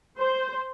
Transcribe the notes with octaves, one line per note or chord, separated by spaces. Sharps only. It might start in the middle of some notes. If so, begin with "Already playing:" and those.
C5